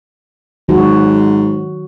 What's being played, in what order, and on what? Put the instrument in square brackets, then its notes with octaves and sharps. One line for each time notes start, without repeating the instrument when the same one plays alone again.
[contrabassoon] G#2 [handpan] D#3 F#3 F#4